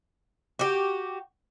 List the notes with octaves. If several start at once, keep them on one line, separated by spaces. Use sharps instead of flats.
F#4 G4